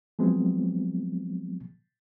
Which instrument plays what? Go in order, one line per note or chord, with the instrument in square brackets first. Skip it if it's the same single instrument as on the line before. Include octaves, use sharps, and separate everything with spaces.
[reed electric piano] F3 F#3 G#3 B3 C4